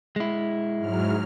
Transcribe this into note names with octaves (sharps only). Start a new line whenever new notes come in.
G#3 E4
G#2 F#3 F6